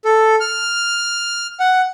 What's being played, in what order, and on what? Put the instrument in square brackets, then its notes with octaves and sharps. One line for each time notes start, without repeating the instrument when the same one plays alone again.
[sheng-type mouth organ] A4
F6
F#5